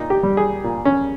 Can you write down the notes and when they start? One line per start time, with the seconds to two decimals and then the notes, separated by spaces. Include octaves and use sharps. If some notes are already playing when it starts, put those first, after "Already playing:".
Already playing: A#2 D#4
0.10 G4
0.23 G3
0.37 G#4
0.64 A#2
0.85 C#4